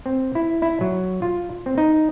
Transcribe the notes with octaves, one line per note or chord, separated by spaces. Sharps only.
C4
E4
E4
F#3
F4
C4
D#4